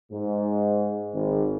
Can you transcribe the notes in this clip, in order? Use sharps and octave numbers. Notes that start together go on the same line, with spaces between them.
G#2
G#1